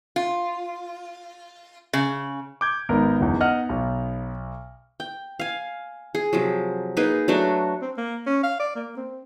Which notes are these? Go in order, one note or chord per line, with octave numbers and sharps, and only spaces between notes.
F4
C#3
D6 G6 G#6
G#1 B3 D#4 A#4
F#1 E2
D#5 F#5 F6
B1
G5
F5 G#5
G#4
C3 F3 F#3
A#3 D#4 G#4 B4
F#3 A3 D4 F#4
C4
A#3
C#4
F5
D5
A#3
C4